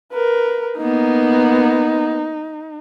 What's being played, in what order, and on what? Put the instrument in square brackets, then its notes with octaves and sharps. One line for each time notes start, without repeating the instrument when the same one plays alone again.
[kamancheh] A#4 B4
[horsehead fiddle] A#3 B3 [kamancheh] D#4